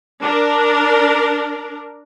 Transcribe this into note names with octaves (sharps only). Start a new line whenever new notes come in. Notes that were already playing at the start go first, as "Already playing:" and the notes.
D4 A#4